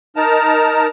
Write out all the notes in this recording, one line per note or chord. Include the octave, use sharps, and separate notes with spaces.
D#4 A#4 A5 A#5